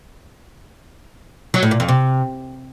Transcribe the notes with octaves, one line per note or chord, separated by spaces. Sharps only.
F#3
A2
A#2
F2
C3